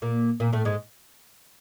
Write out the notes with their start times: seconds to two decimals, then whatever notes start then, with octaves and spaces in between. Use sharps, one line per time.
0.02 A#2 A#3
0.40 A#2 A#3
0.53 A2 A3
0.65 G#2 G#3